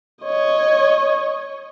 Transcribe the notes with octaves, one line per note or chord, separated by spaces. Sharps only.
C#5 D#5